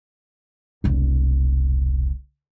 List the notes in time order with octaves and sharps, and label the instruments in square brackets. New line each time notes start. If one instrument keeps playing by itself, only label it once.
[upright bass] E1 C2